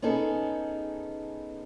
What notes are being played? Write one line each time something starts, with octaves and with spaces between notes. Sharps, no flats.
B3 C#4 D#4 G#4 A4